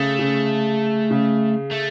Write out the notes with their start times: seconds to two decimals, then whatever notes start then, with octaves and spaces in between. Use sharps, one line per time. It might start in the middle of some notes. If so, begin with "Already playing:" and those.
Already playing: C#3 A3
0.19 C#3
1.10 C#3
1.71 A3